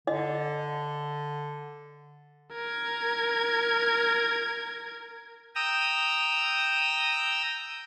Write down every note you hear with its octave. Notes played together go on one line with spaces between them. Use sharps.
D3 D#5
A#4 G#6
G5 A#5 D#6 E6